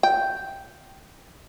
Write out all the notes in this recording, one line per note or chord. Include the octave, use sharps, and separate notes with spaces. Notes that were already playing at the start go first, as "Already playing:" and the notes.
G5